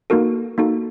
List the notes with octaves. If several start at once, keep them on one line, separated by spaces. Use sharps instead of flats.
A#3 D#4 F#4 A4 A#4
A#3 D#4 F#4 A4